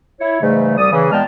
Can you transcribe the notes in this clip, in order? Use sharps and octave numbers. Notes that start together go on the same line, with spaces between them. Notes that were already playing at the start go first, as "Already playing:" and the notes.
E4 C#5
G#2 C#3 E3 G3 A3
C2 G3 D5 D#6
C#3 E3
A#2 G#3 B3 G5 A5 F6